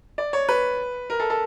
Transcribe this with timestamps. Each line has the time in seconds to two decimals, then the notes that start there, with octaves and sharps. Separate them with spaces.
0.18 D5
0.33 C#5
0.49 B4
1.10 A#4
1.20 A4
1.30 A4